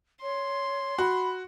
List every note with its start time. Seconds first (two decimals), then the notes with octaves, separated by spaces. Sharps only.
0.22 C#5 C6
0.98 F#4 B5